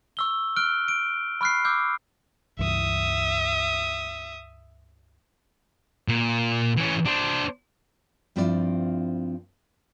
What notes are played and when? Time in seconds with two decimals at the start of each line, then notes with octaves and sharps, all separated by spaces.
0.17 C#6 E6 G7
0.56 F6 F#6 D7 G7
0.88 D7
1.41 B5 C#6 F6 F#6 C7
1.65 C#6 D6 E6 F6 G6
2.59 C#2 G2 E3 E5 D#6
6.08 A#2
6.77 E3 C#4
7.05 D4 C5
8.36 G2 F3 C4 E4 F4 D5